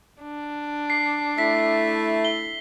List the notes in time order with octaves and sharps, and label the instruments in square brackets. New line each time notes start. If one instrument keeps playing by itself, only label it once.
[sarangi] D4
[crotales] C7
[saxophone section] A3 E4 E5 [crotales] B6
[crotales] G7